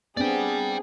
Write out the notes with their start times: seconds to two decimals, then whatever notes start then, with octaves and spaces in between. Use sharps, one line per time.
0.17 B3 C4 D4 G#4 D5 G5